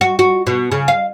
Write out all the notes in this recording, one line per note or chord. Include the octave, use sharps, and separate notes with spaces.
F#4
F#4
B2
C#3
F5